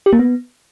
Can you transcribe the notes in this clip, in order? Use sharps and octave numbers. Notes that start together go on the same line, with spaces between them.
G4
A#3
B3